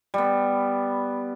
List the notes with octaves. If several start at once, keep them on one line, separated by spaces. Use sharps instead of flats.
G3 B3